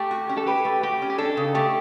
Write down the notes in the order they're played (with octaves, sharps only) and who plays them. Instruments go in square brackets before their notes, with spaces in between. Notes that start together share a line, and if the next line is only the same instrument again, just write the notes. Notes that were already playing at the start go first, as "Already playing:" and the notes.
Already playing: [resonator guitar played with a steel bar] A3 [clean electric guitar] G4
[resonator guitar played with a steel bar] F#4
C#4
[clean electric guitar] A4
[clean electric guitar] G4 [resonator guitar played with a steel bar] B4
[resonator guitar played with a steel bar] A3
[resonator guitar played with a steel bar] F#4 [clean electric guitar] G4
[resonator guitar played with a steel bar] C#4
[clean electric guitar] G4
[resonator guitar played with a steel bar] D4 [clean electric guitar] A4
[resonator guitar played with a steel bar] C#3
[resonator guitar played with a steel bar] A3 [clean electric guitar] G4